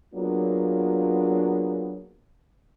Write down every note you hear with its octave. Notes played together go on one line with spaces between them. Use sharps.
F#3 A#3 B3 D4 F4 G#4